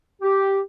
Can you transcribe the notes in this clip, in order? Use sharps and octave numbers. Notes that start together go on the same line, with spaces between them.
G4